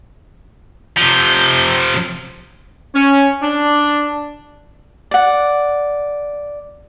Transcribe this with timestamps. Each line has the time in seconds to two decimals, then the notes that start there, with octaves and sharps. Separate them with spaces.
0.97 C3 F3 G6
2.94 C#4
3.42 D4
5.11 D5 F#5